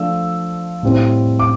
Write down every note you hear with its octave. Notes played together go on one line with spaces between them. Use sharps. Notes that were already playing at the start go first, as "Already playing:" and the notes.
Already playing: F3 A3 D4 E6
A2 G3 C4 E4
D6